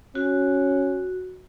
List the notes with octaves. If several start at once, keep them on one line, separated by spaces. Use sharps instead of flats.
C#4 F#4